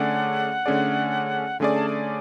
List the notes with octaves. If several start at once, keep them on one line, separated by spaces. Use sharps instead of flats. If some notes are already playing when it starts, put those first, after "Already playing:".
Already playing: D3 A3 C#4 G#4 D5 F#5
D3 A3 C#4 G#4 D5
D3 A3 C#4 G#4 D5 G#5
A5
G#5